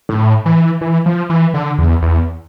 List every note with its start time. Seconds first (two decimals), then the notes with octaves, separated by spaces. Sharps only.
0.09 A2
0.46 E3
0.81 E3
1.06 F3
1.30 E3
1.54 D3
1.78 E2
2.02 E2